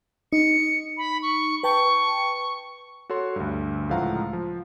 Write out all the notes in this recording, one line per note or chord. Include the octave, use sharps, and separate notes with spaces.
D#4 C#7
B5
C#6
B4 G5 A5 C#6
F#4 A4 C#5 C6
D2 G2
C#2 A2 F3 F5 F#5 A#5
F3